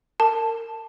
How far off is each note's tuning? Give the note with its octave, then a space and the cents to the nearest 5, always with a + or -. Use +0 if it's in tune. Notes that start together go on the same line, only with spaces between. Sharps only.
A#4 -30 A5 +0